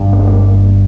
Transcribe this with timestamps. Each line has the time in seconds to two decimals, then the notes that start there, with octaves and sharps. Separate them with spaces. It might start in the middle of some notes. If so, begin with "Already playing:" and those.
Already playing: G1 G2
0.13 A#3
0.20 G#3
0.27 A#3